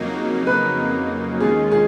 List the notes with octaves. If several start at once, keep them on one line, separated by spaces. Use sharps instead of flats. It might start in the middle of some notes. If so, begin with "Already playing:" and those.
Already playing: F2 C#3 F#3 A#3 D#4
B4
D#2 D#3 G#3 C#4 F4 G#4
G#4